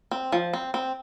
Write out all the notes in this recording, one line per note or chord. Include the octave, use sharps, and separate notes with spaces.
C4
F3
C4
C4